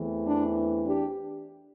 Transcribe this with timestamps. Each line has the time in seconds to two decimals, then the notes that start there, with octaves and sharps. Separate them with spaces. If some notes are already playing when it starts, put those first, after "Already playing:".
Already playing: E2 E3 A3 C4
0.25 D4
0.86 D4 G4